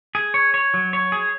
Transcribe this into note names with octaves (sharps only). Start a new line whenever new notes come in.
G#4
C#5
C#5
F#3
C#5
G#4